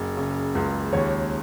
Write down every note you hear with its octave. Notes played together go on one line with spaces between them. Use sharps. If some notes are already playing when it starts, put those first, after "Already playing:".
Already playing: F#1
C#3
C#2
D#2 C#5